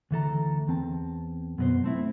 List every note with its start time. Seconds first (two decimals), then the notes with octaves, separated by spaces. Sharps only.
0.11 D2 E3 A4 A#5
0.67 E2 C4 A5
1.58 F#2 B2 C5
1.84 A3 C4 E4